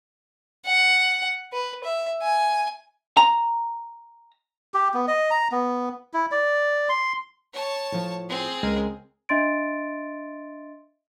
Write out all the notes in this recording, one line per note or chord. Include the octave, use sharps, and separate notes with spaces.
F#5
B4
E5
G#5
A#5
G4
B3
D#5
A#5
B3
E4
D5
C6
C#5 A5
A2 F3
C4 G#4
C#2 G#3 A#4
D4 D#5 E5 C6 A6 D7